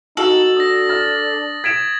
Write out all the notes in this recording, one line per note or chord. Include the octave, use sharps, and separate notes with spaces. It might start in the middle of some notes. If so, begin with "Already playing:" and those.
D#4 F#4 A4 F#7
D4 D#6 A#6
F6 A6
G#6 B6 D7 E7